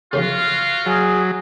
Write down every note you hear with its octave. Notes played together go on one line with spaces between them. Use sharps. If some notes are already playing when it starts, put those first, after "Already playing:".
B1 F2 C#3 F4 F#4 F5
F#3 G#4